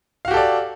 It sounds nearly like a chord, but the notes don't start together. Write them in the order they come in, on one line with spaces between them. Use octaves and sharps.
F5 F#4 G4 A4 D5